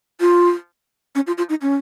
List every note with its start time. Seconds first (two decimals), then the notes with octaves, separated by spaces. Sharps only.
0.20 F4
1.15 C#4
1.27 F4
1.38 F4
1.49 D#4
1.62 C#4